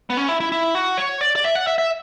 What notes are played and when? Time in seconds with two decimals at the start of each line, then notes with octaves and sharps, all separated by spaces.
0.10 B3
0.17 C#4
0.29 E4
0.40 E4
0.52 E4
0.75 F#4
0.98 C#5
1.21 D5
1.36 D5
1.44 E5
1.55 F#5
1.67 E5
1.78 E5